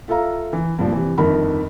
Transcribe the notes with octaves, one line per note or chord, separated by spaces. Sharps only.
F4 A4 E5 F5 A#5
E3
G2 A#2 F3
C3 E3
G1 F2 D#3 A#4 B5